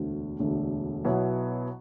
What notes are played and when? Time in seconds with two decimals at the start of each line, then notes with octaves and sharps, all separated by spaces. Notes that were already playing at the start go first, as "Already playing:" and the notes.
Already playing: E1 D2 D3 A3
0.39 E1 D2 D3 A3
1.04 B1 B2 F#3 B3 E4